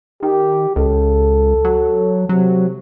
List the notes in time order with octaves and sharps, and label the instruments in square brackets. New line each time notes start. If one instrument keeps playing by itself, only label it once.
[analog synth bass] D#3 [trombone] G4
[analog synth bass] C#2 [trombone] A4
[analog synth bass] F#3
[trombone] C3 [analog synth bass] F#3